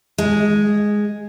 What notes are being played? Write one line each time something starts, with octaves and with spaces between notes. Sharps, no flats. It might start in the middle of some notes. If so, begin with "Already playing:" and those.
G#3